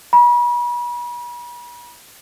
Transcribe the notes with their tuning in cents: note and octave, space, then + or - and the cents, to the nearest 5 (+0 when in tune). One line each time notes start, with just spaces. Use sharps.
B5 -40